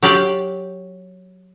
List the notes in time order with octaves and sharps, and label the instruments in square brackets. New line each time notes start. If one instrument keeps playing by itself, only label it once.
[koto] F#3 G4 D5 F5 G5